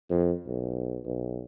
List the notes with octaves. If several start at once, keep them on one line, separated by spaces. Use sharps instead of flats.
F2
B1
B1